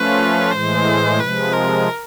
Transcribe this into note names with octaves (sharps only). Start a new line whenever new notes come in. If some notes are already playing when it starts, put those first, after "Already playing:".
Already playing: F3 A3 C#4 F4 B4
A2 E3 G#3 C5
C3 F3 G#3 B4
A#4